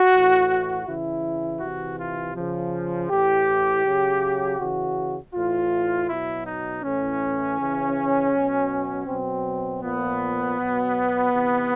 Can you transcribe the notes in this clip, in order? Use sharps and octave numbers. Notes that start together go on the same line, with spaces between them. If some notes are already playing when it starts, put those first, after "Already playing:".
Already playing: F#4
A2 E3
C#3 E3 E4
C3 E3 F#4
F4
C#3 F3
A2 E3 G4
C#3 F#3
C#3 E3 F#4
A2 E3 F4
B2 F#3 E4
D#4
A2 E3 C#4
C#3 E3
B2 F#3
B2 F#3 C4
A#2 F3 B3
B2 F#3
C3 E3